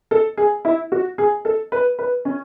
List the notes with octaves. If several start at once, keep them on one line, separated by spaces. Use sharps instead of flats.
A4
G#4
E4
F#4
G#4
A4
B4
B4
C#4